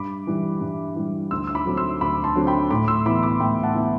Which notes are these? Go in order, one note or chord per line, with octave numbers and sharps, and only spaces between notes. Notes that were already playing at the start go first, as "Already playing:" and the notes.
Already playing: G2 B5 D6
E3 G3
G2
E3 G3
D2 C6 E6
E6
B5 D6
D3 F#3 C4
C6 E6
D2 B5 D6
A5 C6
D3 F#3 C4
G5 B5
A2 B5 D6
C6 E6
E3 B3 E4 B5 D6
B5 D6
A2 G5 B5
F#5 A5
E3 B3 E4